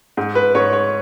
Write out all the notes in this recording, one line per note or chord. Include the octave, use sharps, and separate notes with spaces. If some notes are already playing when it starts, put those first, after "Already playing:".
G#2
B4
G#2 C#5
C#5